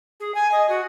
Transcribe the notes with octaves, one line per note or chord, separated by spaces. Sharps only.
G#4
G#5
D#5
F#4